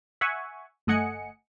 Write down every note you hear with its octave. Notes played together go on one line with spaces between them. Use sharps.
E5 F#5 G#5 C#6
G1 A3 D#5 F#5 G#5 C#7